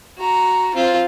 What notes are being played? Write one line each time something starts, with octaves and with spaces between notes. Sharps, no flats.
F#4 A#5
C4 F4